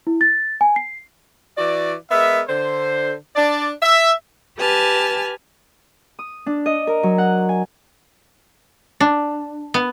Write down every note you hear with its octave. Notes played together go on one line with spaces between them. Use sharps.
E4
A6
G#5
C7
E3 F#4 D5
G#3 B3 A#4 E5
D3 C5
D4 D5
E5
G4 B4 G#5 A5 F6
D#6
D4
D#5
A#4
F#3
F#5
G#5
D4
B3